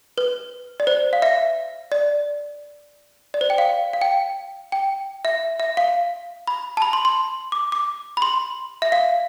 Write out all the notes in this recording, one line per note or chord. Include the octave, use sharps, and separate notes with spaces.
B4
D5
C5
F5
E5
D5
D5
C5
G5
F5
F5
G5
G5
E5
E5
F5
B5
A5
B5
C6
C6
D6
D6
B5
C6
E5
F5